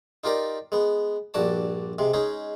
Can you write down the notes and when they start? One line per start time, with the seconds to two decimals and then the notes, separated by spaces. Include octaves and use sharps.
0.24 D#4 F4 G4 A#4 D5
0.72 G#3 B3
1.34 A#1 G2 F#4 D5 A5
1.99 C3 G#3
2.14 G#3 C#4 D#4 G#4